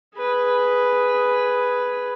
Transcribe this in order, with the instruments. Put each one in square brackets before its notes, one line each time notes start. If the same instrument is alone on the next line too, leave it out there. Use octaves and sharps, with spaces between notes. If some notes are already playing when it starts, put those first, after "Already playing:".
[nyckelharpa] G#4 B4